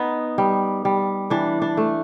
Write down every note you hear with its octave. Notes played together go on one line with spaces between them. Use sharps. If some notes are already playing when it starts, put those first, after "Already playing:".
Already playing: B3 D#4
G3
G3
E3 D4
D4
A3